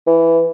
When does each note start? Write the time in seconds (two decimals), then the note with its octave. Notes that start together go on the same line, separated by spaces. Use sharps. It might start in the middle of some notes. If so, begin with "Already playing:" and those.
0.07 E3